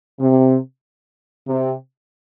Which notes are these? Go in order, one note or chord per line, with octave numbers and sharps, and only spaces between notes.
C3
C3